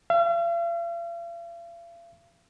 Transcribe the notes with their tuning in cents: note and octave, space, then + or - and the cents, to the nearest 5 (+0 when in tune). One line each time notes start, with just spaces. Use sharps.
F5 -45